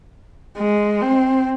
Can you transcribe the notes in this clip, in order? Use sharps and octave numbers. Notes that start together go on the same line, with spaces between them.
G#3
C4